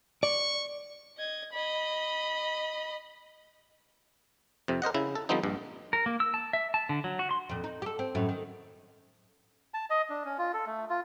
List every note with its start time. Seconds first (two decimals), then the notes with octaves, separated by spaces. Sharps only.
0.23 D5 C#6
1.17 D#5 G#6
1.52 D#5 B5
4.68 F2 C3
4.82 A#4 C5 D#5 F#5
4.94 C#3 E4
5.15 A4
5.29 D3 F3 G3 B3 C4 D#4
5.43 A#1 G2
5.93 A#4
6.06 A#3
6.20 E6
6.34 A5
6.53 E5
6.74 A5
6.89 D3
7.04 F#3
7.19 F#4
7.31 C6
7.49 F2 A#2
7.64 D#4
7.82 G4 A4
7.99 C4
8.15 F#2 A2
8.29 D#3
9.74 A5
9.90 D#5
10.10 D4
10.25 C#4
10.38 F4
10.53 A4
10.66 A3
10.90 F4